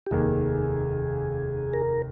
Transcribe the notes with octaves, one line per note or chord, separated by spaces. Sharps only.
G4
F1 D#2 D#3 A#3 G#4
A#4